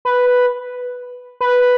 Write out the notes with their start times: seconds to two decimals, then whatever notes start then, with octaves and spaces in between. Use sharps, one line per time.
0.05 B4
1.41 B4